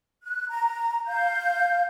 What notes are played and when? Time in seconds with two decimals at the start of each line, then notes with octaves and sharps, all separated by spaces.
0.23 F#6
0.49 A#5
1.07 F5 G6